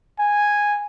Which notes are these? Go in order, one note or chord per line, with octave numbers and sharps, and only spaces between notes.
G#5